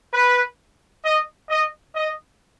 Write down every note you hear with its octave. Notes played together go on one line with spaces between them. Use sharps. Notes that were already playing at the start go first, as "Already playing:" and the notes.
B4
D#5
D#5
D#5